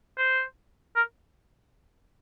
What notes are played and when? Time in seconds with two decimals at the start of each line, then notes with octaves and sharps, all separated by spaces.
0.18 C5
0.96 A#4